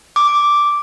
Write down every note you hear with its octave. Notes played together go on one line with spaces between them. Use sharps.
D6